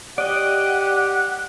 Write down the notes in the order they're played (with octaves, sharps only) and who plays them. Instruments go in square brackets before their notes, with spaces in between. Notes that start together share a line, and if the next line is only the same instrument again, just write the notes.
[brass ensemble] G4 [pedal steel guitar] D5 D#5 C#6 [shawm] F#5